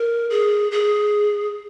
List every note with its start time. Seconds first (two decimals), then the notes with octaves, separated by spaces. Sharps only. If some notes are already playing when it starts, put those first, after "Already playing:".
Already playing: A#4
0.30 G#4
0.72 G#4